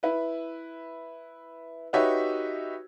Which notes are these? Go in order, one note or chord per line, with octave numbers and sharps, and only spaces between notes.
E4 B4
D#4 F#4 G4 B4 C#5 E5